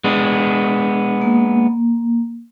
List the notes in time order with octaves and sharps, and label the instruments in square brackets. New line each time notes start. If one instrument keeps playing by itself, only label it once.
[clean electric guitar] G#3 B3 D4
[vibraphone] A#3